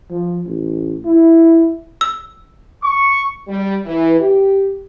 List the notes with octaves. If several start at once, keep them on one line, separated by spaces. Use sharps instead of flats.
F3
A1
E4
E6
C#6
G3
E3
G4